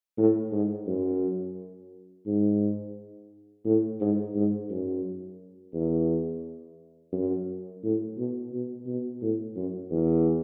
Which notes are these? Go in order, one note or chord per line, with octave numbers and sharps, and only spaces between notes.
A2
G#2
F#2
G#2
A2
G#2
G#2
F#2
E2
F#2
A2
B2
B2
B2
A2
F#2
E2